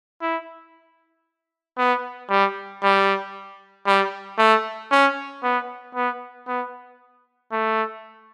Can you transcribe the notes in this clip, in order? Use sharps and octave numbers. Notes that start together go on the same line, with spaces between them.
E4
B3
G3
G3
G3
A3
C#4
B3
B3
B3
A3